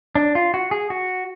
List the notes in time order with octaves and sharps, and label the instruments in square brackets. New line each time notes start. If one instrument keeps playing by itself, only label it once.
[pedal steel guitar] D4
F4
F#4
G#4
F#4